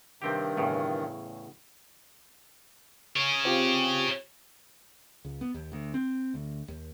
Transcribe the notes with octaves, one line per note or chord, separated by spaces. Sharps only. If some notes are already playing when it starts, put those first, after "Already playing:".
G2 C3 D#3 C4 G4
E2 A2 C#3
G#4 C#5
C4 F4 G4
C#2
B3
D#2
D2
C4
D2
D#2